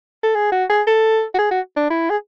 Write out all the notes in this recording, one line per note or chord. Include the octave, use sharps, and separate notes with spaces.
A4
G#4
F#4
G#4
A4
F#4
G#4
F#4
D4
E4
G#4